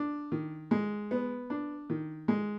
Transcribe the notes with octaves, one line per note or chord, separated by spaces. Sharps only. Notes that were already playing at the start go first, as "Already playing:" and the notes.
Already playing: D4
D#3
G#3
B3
D4
D#3
G#3